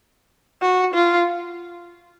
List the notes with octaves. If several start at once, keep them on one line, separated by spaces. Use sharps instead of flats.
F#4
F4